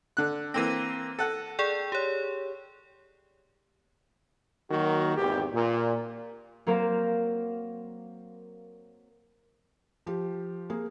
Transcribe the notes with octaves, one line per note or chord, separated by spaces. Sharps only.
D3 F#6
E3 A#3 C4 A#6 D#7
A4 F#5
G#4 D5 G5
G4 C#5
D#3 F#3 A#3 F#4 A#4
G#1 E2 G4
A#2
F#3 A#3 C4 A#4 C5 F5
F3 G4
A#3 G#4